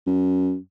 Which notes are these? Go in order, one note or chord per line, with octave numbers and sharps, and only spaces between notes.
F#2